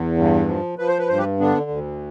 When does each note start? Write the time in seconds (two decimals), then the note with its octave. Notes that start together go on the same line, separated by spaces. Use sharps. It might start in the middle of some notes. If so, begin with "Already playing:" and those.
Already playing: E2
0.18 G2
0.48 F3
0.78 F3 B4
0.88 C5
0.99 B4
1.08 G2 C5
1.18 G4 B4
1.40 D3 B3 D4
1.70 D2